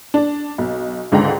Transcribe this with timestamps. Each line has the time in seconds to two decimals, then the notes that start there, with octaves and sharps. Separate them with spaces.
0.14 D4
0.58 B1
1.12 C#2 G#2 D3 G5 A#5